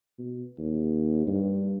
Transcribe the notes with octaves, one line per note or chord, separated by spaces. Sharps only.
B2
D#2
G2